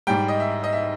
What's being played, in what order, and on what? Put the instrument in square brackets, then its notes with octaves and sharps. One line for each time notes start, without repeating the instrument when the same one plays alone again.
[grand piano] G#2 G3 G5
D#5
E5
D#5
E5